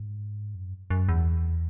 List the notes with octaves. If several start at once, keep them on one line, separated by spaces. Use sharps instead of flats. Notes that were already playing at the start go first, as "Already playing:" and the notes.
Already playing: G#2
F#2
F#2
E2